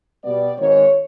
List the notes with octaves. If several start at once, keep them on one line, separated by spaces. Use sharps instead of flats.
B2 G3 B3 D5
G#1 G#2 D#3 C#5